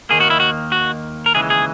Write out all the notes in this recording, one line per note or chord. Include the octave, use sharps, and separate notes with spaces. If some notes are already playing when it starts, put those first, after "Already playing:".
D#2 D#3 A#3 G#4
F#4
E4
F#4
F#4
A#4
D#2 C#3 E3 G#3 G#4
G#4